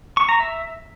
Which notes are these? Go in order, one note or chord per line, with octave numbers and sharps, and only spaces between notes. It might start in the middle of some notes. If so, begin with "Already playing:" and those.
C#6
A#5
E5